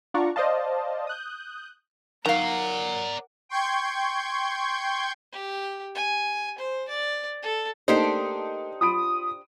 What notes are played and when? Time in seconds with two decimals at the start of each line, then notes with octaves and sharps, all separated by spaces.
0.14 D4 F4 D5 F#5 A#5 C#6
0.36 C5 D5 D#5 F5 A5
1.07 D#6 F#6 G6
2.26 D#3 F#3 A#4 D5 F5 F#5 A#5
3.49 G5 C6 C#6 G6 G#6
5.32 G4
5.95 G#5
6.58 C5
6.88 D5
7.42 A4
7.88 A3 A#3 D4 D#4 G4 C5
8.81 F4 B5 D#6 D7